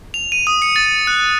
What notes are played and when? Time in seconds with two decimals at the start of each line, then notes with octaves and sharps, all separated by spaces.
0.14 F7
0.32 D#7
0.47 D#6
0.62 C#7
0.76 A6
1.07 F#6